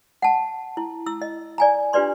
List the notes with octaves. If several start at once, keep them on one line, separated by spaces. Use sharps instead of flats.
F#5 A5
E4
E4 E6
D#5
D5 G#5 A#5
D4 F4 G4 B4 D5 C6